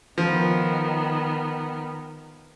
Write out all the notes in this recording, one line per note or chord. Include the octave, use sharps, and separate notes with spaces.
D#3 F3 B3